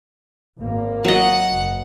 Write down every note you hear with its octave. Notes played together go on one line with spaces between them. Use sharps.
G#1 A#3
F#3 D#5 F#5
F#1